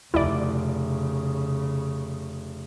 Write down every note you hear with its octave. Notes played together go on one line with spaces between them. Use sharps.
F1 C#3 E4 D5